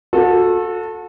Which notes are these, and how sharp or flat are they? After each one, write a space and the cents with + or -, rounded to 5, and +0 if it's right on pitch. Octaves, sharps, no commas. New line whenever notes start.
F#4 -40 A4 +0